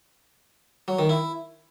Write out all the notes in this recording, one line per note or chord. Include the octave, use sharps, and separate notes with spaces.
F#3
D#3
E4